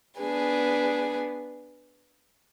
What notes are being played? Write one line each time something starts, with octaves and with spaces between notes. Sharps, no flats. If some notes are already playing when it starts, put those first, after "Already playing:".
B3 D4 G#4 B4